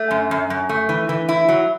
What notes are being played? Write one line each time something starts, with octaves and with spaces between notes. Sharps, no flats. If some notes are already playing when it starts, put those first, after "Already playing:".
Already playing: A3
F#2
F#2
F#2
A3
E3
E3
E4
F#3